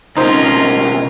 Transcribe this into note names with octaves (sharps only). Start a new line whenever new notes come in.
C#2 B2 C#4 D#4 F4 A#4 C5